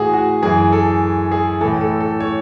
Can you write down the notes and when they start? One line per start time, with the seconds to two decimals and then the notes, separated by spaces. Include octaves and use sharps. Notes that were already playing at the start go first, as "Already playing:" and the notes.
Already playing: A2 E3 F#4 G#4
0.13 F#4
0.43 F#2 E3 G#4
0.72 A4
1.32 G#4
1.61 A2 E3 A4
1.81 A4
2.01 A4
2.20 C#5